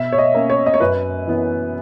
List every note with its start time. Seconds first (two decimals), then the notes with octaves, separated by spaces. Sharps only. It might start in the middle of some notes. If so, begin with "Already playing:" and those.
Already playing: B2 E5
0.12 C#5
0.18 D#5
0.34 A#3 C#4
0.50 C#5
0.66 D#5
0.74 C#5
0.80 F#2 B4
1.27 E3 B3